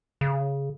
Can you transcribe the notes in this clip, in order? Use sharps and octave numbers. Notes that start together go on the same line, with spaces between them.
C#3